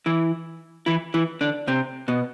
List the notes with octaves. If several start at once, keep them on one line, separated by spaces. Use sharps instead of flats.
E3 E4
E3 E4
E3 E4
D3 D4
C3 C4
B2 B3